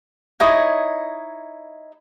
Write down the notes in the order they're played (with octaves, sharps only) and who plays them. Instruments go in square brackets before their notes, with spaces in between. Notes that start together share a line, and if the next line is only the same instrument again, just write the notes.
[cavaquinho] D#4 E4 C#5 D#5